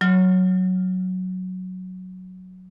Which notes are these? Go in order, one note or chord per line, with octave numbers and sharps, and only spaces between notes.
F#3 F6